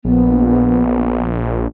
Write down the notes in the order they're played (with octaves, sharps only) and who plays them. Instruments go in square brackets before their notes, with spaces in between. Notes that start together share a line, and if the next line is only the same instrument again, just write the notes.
[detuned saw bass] A#1 [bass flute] B3